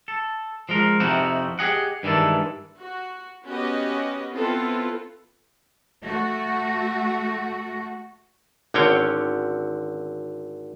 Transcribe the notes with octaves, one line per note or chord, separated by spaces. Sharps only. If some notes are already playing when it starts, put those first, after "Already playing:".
A4
F3 G#3 A#4
F2 C3 F3 D#4 E4 F#4
G4 G#4 D#5 F#5
G2 D#3 E3 G#3 A4
F#4
B3 C#4 F#4 G4 B4 D#5
B3 C4 E4 F4 A4 B4
A3 F#4
G#1 D3 C4 C#4 C#5 G5